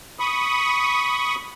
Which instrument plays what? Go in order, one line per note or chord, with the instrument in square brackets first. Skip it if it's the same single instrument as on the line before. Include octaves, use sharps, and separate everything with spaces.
[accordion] B5 C#6 D#6